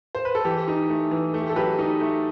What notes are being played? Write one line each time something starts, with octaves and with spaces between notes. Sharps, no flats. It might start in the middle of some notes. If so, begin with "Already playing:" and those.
C5
B4
A4
E3 G4
D#4
A3
E3
A3
G4
A4
F#3 G4 B4
D#4
A3